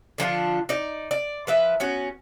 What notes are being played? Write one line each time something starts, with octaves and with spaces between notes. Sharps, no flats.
D3 F3 D4 F4
D#4 D5
D5
F3 B4 E5
B3 C#4 F#4